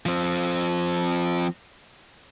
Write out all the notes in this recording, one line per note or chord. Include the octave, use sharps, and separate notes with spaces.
F3 C4